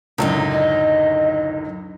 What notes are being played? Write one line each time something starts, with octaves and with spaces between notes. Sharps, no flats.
C#2 F#2 A2 D3 F#3 D#4
D#5